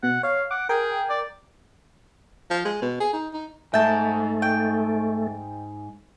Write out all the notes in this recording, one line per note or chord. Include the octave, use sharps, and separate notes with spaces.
B2 F#5
C#5 F5
F#5 D6
G#4 A#4 G5
D5
F3
G#3
B2
G#4
D#4
D#4
G#2 A3 E5 G5 A5
G5